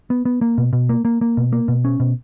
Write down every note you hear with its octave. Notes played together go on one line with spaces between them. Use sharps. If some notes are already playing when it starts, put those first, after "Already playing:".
B3
B3
A#3
B2
B2
A#3
A#3
A#3
B2
A#3
B2
C#4
B2